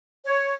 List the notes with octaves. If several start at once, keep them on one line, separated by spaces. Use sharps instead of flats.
C#5